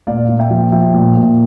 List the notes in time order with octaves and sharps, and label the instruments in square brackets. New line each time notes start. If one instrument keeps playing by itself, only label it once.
[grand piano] A#2 D5 F5
A#2
E5 G5
F3
F3 E5 G5
A#2
A#2